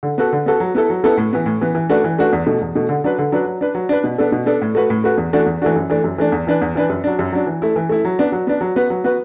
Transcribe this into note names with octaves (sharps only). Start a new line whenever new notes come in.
D3
B3 F#4 A4
D3
B3 F#4 A4
F#3
B3 E4 A4
F#3
B3 E4 A4
A2
E3 B3
A2
E3 B3
E3
A3 D4 F#4 B4
E3
A3 D4 F#4 B4
E2
B2 A3
E2
B2 A3
D3
F#3 D4 B4
D3
F#3 D4 B4
F#3
D4 B4
F#3
D4 B4
B2
B3 D4 A4
B2
B3 D4 A4
A2
A3 F#4 B4
A2
A3 F#4 B4
E2
E3 A3 D4 F#4
E2
E3 A3 D4 F#4
F#2
E3 A3 D4
F#2
E3 A3 D4
E2
E3 D4 B4
E2
E3 D4 B4
F#2
F#3 D4
F#2
F#3 D4
E3
A3 E4
E3
A3 E4
F#3
B3 D4
F#3
B3 D4
F#3
B3 F#4 B4
F#3
B3 F#4 B4